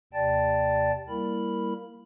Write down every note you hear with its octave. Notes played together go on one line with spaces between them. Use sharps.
D#2 C3 D5 G5 A5 A6
G3 A#3 E4 A#4 B5